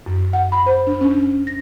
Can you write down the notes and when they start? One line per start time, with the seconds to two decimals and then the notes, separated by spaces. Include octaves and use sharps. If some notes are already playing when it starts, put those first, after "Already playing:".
0.06 F#2
0.33 F#5
0.52 B5
0.66 C5
0.87 D4
1.01 C#4
1.47 A#6